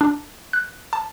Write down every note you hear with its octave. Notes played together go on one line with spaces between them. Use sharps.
D4
F#6
A5